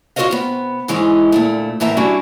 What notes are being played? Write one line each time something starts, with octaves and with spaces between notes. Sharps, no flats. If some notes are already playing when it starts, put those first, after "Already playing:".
F4 F#4 A4 C#5 D#5 F5
C3 B3
G#2 E3 G#3 C#4 D#4
D2 A#2 A3
E2 A2 A#3 E5 A#5
G3 C#4 D4 E4 F#4 G4